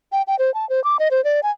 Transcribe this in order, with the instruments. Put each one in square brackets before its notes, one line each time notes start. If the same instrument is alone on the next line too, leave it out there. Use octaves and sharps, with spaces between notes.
[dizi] G5
G5
C5
A5
C5
D6
D#5
C5
D5
G#5